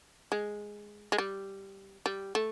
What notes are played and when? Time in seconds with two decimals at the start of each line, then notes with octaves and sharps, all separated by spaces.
0.32 G#3
1.12 G#3
1.18 G3
2.06 G3
2.35 A3